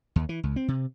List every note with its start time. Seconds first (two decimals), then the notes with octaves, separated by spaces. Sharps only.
0.16 D#2
0.29 E3
0.43 C#2
0.56 C4
0.68 C3